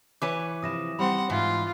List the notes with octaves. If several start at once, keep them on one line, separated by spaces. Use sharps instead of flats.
E3 B4 C#5 D6 D#7
C3 F3 E4 D#6 A#6 E7
G3 C4 F#5 B5 C6
G#2 E3 F4